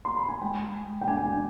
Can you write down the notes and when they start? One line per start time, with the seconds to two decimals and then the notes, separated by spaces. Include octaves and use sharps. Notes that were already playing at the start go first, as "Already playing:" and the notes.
0.05 C6
0.16 B5
0.29 G#5
0.41 G#3 G5
0.75 G#3
1.01 G5
1.08 D4 G#5